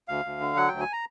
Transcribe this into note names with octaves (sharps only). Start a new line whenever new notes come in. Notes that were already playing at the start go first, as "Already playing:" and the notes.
D2 F5
D2
D3
F#3 F#5
D2 G5
G#5
A#5